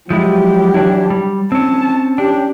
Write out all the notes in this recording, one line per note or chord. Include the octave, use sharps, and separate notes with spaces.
F3 F#3 G#3 E4 G4
E3 D4 E4
G3
C4 C#4 A5
C#4 D4 G4